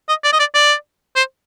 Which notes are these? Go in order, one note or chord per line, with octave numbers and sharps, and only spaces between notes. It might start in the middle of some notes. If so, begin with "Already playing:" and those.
D#5
D5
D#5
D5
D5
C5